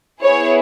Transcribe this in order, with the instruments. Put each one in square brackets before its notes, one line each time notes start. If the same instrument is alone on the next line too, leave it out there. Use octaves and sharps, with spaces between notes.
[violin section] B3 E4 G#4 C#5